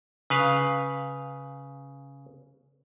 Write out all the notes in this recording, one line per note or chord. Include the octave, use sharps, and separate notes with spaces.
C#3 B4 F5